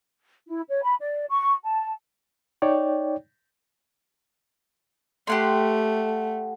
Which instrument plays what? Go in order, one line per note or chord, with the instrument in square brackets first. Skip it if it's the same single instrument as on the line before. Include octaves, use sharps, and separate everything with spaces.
[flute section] E4
C#5
B5
D5
C#6
A5
[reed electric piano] D#4 C#5 D5 G5
[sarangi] A3 [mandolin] G4 F#5 C6